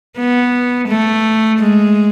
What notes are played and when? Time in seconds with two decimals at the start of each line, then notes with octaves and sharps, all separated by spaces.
0.18 B3
0.88 A3
1.59 G#3